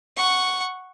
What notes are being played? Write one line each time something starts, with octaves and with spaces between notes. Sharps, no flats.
F#5 C#6